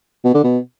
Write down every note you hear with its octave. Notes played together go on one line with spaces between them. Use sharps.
B2
D3
B2